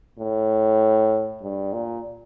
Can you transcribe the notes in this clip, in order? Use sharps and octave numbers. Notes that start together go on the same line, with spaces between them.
A2
G2
A#2